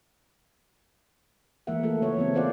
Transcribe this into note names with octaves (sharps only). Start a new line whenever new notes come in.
E3 G#3 A#3 A#4 E5 F#5
A3 F4 A4
C#3 F#4 C#5
E3 F#3 G#3 B3 C4
F4 F#4 C5 D5 F5 F#5